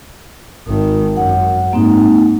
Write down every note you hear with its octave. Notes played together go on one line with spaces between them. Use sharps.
G#1 D#3
F#2 F#5
G#2 A#3 C4 D#4